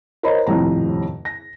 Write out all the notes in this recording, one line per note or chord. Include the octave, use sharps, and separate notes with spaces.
A#4 C5 C#5 D#5 A#5 B5
D#1 F2 A2 C3 A#5
A#6